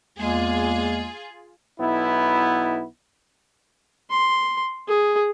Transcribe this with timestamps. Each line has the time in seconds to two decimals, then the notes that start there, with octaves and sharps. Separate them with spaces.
0.18 E2 G#3 A#3 F4 G#4
1.79 B1 B3 E4
4.10 C6
4.88 G#4